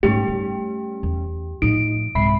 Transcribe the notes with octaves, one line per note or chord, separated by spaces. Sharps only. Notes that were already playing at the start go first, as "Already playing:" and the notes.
G#2 G3 A3 C#4 D#4 G4
D#4
E2
A2 F3 D#4 D7
C2 G#2 E5 B5 C7